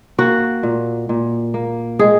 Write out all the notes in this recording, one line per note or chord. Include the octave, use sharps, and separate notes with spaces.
A#3 F#4
A#2
A#2
A#3
G#3 G#4